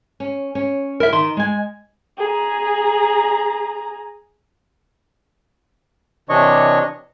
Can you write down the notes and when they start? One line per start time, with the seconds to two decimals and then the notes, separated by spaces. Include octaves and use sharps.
0.20 C#4
0.55 C#4
1.00 E4 A#4 E5
1.13 D#3 C6
1.37 G#3 G#5
2.18 G#4 A#5
6.29 C3 E3 D4 C#5 D#5 C#6